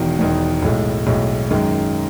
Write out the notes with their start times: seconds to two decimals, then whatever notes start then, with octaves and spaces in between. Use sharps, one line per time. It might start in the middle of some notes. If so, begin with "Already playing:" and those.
Already playing: E1 E2 D#3
0.18 E1 E2 D#3
0.63 B1 A2 G#3
1.07 B1 A2 G#3
1.50 F#2 D#3 G#3